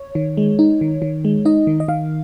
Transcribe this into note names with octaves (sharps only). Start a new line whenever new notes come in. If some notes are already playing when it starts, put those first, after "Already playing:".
Already playing: C#5
D#3
G#3
D#4
D#3
D#3
G#3
D#4 D#5
D#3
D#5
D#3 F5